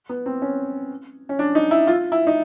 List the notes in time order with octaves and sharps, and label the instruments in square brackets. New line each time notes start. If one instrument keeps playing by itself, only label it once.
[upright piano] B3
C4
C#4
C#4
D4
D#4
E4
F4
E4
D#4